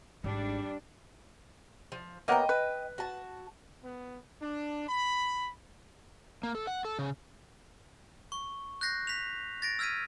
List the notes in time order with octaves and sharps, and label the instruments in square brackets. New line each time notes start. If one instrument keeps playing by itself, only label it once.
[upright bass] G#1 [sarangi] G3 [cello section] D4
[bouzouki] F3
[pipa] F#3 A#3 B3 [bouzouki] D#5 F5 G5
[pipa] B4
[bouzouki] F#4 A5
[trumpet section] B3
D4
B5
[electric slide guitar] A#3
A4
F#5
A4
C#3
[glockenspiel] C#6
F#6 G6 A#6 C7
B6 F7
A6 A#6 D7
E6 F6 G#6 B6 D#7